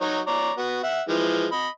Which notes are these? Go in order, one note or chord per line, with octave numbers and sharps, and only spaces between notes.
F#3 D#4 C#5
C#5 D5 A#5
B3 F#4
E5 F#5
E3 F3 G#3
D#5 B5